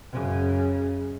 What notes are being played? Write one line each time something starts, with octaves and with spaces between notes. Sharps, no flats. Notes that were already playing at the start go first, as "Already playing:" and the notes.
F#2 C#3